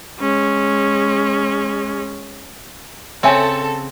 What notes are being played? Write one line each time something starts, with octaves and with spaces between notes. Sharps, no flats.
G#3 C#4
C#3 C4 A4 C#5 E5 G#5